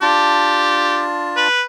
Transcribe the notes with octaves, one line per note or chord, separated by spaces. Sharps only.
D4 F4 G4 A5
B4